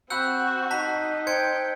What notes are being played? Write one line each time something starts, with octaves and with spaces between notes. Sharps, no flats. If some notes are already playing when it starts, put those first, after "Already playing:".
C4 F#4 F#5 B5 E6 F#6 G6 C#7
D#4 A5 A#5 B6
C5 G5 G6 G#6 C#7